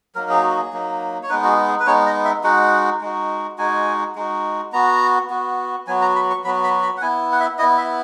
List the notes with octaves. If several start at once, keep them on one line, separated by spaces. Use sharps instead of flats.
F#3 A#3 D#4 A#4
G#4
F#4
G#4
F#3 A#3 D#4
C#5
G#3 B3 D#4 B4
F#4
G#4
G#4
B4
G#3 B3 D#4 C#5
D#5
E5
G#3 D#4 F#4 F#5
G#3 D#4 F#4
G#3 D#4 F#4 G#5
G#3 D#4 F#4
B3 F#4 A#5
B3 F#4
F#3 B3 F#4 G#5
A#5
B5
C#6
F#3 B3 F#4 B5
B5
B5
F#5
B3 E4 G#5
F#5
E5
B3 E4 D#5
E5